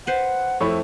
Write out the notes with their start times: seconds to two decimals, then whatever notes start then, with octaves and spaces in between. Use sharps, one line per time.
0.07 B4 C5 F#5
0.61 F2 A3 E4 C#5 B5